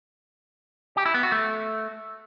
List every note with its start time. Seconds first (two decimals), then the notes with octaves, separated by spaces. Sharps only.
0.97 G4
1.06 E4
1.14 B3
1.23 F#4
1.32 A3